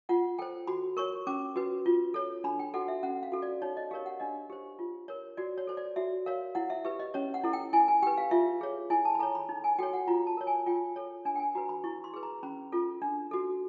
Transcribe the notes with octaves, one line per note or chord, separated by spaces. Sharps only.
F4 F#5
A4 C5 G5
F#4 B5
A#4 C#5 C#6
C#4 D6
F#4 B4
F4
A4 C#5
D4 B5
G5
F#4 A4 F#5
E5
C#4 F#5
F5
F#4 A4
D5
D#4 C#5
D#5
G4 A#4 C#5 F5
F#5
D4 D#5
G4 C5
F4
A#4 C#5
F#4 D5
C#5
A4 C5
D5
F#4 E5
A#4 C#5 F5
E4 F#5
E5
G4 B4 E5
D#5
C#4 C#5
F#5
E4 A4
G5
E4 G#5
G#5
G4 B4 G5
F5
F4 E5
G#4 C#5
E4 G#5
A5
B5
A4 C#5 A#5
B5
D#4
G#5
F#4 A4 C#5 G5
F#5
F4 A#5
A5
A#4 C#5
G#5
F4 G5
A4 C#5
D4 G#5
G5
G#5
F#4 B4 A#5
B5
E4 C#6
C6
G#4 B4
A#5
C#4 B5
F4 A4
D4
F#4 A4